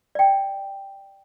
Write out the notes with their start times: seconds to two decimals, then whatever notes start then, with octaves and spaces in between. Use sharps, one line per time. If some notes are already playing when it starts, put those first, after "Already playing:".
0.15 D5 G5